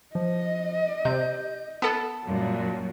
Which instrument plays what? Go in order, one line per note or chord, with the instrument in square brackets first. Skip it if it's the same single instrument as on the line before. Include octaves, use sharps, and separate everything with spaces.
[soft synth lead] F3 [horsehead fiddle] D#5
[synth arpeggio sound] C3 [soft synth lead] G6
[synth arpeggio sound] B3 A4 [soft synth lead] A5
[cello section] F#2 A#2 G3 [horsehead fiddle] F#3